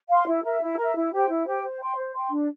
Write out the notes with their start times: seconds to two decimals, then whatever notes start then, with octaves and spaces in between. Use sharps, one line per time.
0.09 F5 C6
0.27 E4
0.43 A#4 E5
0.61 E4
0.77 A#4 E5
0.95 E4
1.12 G4 C5 G5
1.29 E4
1.46 G4 C5 G5
1.62 C5
1.80 G5 C6
1.96 C5
2.14 G5 C6
2.30 D4